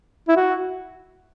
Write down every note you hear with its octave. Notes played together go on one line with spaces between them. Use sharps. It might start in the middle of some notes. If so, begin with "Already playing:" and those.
E4
F#4